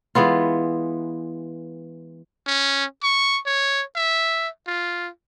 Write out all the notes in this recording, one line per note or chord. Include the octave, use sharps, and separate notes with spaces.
E3 G#3 B3 F4
C#4
C#6
C#5
E5
F4